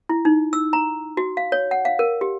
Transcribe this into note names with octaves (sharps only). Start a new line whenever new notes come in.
E4
D#4
E6
A#5
F#4
F5
C#5
F#5
F5
A#4
G4